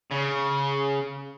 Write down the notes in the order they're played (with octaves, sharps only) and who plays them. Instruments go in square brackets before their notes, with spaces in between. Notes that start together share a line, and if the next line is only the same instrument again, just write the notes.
[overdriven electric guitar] C#3